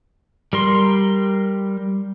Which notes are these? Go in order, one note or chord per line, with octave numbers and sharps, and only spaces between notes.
G3 A#4 C6